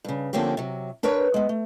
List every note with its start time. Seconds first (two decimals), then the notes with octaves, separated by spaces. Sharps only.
0.04 G2 C#3
0.33 D3 F3 A#3 C4 C#4 G4
0.57 C3 F#3
1.03 D4 A#4 B4 C#5
1.34 G#3 B3
1.49 A3